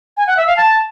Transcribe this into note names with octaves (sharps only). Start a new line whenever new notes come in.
G#5
F#5
E5
F5
A5